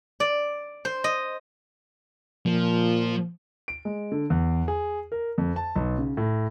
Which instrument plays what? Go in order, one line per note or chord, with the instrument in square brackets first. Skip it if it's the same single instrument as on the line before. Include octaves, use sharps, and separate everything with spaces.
[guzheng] D5
C5
D#5
[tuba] A#2 [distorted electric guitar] F3
[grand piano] D7
G#3
D3
E2
G#4
A#4
F2
A5
B1
C#3
A2